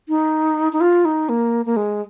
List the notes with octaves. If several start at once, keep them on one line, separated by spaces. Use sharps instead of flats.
D#4
D#4
F4
D#4
A#3
A#3
G#3